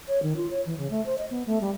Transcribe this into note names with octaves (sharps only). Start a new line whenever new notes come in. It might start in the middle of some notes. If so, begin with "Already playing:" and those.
C#5
D#3
F4
C#5
E3
C#3
A3
C5
D#5
B3
A3
G3